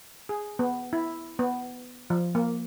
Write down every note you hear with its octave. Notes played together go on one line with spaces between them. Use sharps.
G#4
B3
E4
B3
F3
A#3